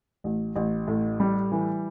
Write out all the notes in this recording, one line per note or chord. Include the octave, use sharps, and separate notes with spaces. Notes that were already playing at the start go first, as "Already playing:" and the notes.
A1
A1
A2
G3
E3